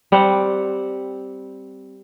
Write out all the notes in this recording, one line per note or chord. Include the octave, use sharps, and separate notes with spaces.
G3 C4 F#5